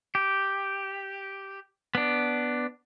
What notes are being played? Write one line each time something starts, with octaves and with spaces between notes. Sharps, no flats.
G4
B3 D4